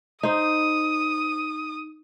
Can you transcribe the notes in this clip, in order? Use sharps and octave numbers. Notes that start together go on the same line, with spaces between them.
D#4 C5 D#6